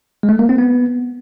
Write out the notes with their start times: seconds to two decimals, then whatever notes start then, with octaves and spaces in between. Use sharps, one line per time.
0.23 G#3
0.29 A3
0.39 A#3
0.49 C4
0.58 B3